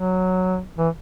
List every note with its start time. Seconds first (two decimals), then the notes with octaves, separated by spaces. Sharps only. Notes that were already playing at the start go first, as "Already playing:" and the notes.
Already playing: F#3
0.78 E3